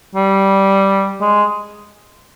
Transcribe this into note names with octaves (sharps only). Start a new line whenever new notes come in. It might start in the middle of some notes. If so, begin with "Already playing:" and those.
G3
G#3